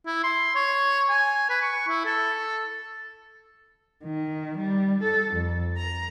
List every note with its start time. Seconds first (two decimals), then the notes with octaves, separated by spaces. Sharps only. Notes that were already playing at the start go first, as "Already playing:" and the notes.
0.06 E4
0.24 C6
0.56 C#5
1.10 G#5
1.50 B4
1.62 C#6
1.88 E4
2.05 A4
4.04 D#3
4.57 G3
5.02 A4
5.33 F2
5.77 A#5